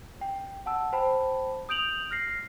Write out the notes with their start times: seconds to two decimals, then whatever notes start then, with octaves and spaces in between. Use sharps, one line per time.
0.21 G5
0.66 F#5 A5 E6
0.93 C5 G5 A5 B5
1.69 D#6 G6 D7 F7 F#7
2.11 F6 A#6 C7